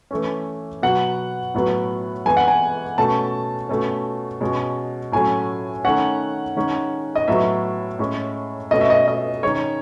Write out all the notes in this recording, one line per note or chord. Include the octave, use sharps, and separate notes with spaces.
E3 A3 C#4
B2 F#3 B3 F#5
A2 F#3 B3
E3 G#3 B3 G#5
F#5
G#5
B2 A3 C#4 A5
B2 A3 C#4
B2 G#3 C#4
A2 F#3 A3 C#4 G#5
D#3 A3 C#4 F#5
D#3 G#3 C#4
D#5
A2 F#3 B3 E5
A2 G#3 C#4
B2 A3 C#4 D#5
E5
D#5
D#5
D#3 G#3 C#4 C#5